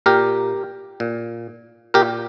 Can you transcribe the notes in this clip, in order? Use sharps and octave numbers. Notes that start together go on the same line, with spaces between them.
A#2 G4 A#4
A#2
A#2 G4 A#4